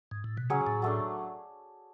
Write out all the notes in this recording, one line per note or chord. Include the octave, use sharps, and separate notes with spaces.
G#2
A2
B2
C#3 F#3 C#4 G#4
A2
F#3 A3 D4